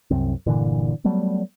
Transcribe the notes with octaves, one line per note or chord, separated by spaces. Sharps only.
C2 F#2 C4
G1 A#2 D3 E3
F#3 G3 A3 B3